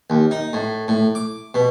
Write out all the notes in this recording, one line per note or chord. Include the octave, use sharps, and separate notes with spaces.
D#2
D#4
A2
A2
D6
B2